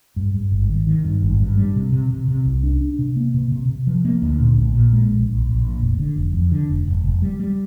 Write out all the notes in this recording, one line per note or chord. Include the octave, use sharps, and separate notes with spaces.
G2
G2
G#1
D#3
D#3
G2
G#1
G2
G3
C3
C3
C3
C3
C2
D4
D4
C3
A#3
C3
C3
C3
F3
A#3
D2
A#2
A#1
A#2
G#3
A#1
A#1
A#1
A#2
F1
D3
F1
F2
D3
F1
F1
F1
G3
G3